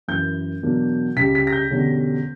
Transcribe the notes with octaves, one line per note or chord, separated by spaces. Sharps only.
F#2 E3 A#3 G6
E2 B2 F#3 A#3 D4
C#2 C#3 G3 B6
B6
A#6
G6
E1 E2 D3 G3 C#4